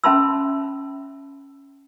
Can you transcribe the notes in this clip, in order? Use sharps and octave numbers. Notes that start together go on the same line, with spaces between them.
C#4 E5 A5 B5 C6 E6